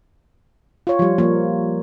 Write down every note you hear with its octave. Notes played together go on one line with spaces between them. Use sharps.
F4 C#5
F3 G3
F3 A#3